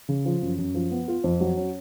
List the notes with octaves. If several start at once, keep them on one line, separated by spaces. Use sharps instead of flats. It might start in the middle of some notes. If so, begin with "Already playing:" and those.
C#3
F3
F#2
F#2
F3
B3
F4
F2
F#3
C#4